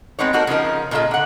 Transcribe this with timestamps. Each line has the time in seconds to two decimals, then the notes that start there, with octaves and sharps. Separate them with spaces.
0.19 G#3 B3 C4 D#4 C#5
0.33 A#3 D#4 F#4 A4 A#4
0.47 C#3 F3 D#4 A#4
0.91 A#2 C#3 G#3 F4 A4 D#5
1.11 D3 F#5